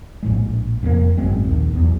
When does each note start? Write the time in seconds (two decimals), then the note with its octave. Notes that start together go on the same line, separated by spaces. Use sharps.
0.23 A#1 A2 G#3
0.83 F1 F2 G#2 A#3
1.17 G#1 F#2 G#3 C4
1.44 A#1 D#2
1.73 B1 E2